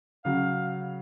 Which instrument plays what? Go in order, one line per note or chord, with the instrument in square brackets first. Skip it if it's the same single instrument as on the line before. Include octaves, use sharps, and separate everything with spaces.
[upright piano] C#3 F#3 [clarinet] F5